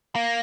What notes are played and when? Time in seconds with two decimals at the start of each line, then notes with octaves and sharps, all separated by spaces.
0.15 A#3